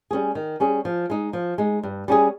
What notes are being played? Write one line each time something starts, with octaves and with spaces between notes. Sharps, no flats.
G3 C#4 G#4
D#3
G3 C#4 G#4
F3
G#3 D#4
F3
G#3 D#4
G2
G3 C#4 G#4